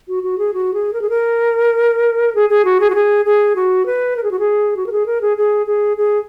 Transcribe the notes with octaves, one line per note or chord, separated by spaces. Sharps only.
F#4
F#4
G#4
F#4
G#4
A#4
G#4
A#4
G#4
G#4
F#4
G#4
F#4
G#4
G#4
F#4
B4
A#4
G#4
F#4
G#4
F#4
A#4
G#4
A#4
G#4
G#4
G#4
G#4